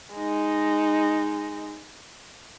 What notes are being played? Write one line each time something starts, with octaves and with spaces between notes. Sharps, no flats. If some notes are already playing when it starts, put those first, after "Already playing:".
G#3 D#4